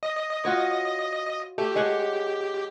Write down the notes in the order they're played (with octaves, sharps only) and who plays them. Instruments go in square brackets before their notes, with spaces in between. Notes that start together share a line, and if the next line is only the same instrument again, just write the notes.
[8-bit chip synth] D#5
[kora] F4 F#4 C#5
[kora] A3 [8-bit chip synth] G4
[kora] G#3 C#5 F#5